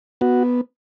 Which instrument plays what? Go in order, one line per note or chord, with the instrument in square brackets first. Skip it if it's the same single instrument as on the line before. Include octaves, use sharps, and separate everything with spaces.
[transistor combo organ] B3 F#4